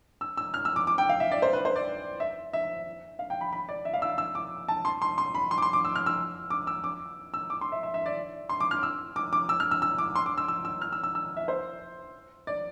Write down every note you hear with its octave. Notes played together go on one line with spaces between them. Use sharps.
E6
E6
F6
E6
D6
D6
G5
F5
E5
D5
C5
B4
C5
D5
E5
E5
F5
G5
B5
B5
D5
E5
F5
E6
E6
D6
A5
C6
C6
C6
B5
C6
D6
C6
D6
E6
F6
E6
D6
E6
D6
E6
D6
C6
E5
E5
E5
D5
C6
D6
F6
E6
D6
D6
E6
F6
E6
E6
D6
C6
D6
E6
E6
E6
F6
E6
E6
E6
E5
C5
D5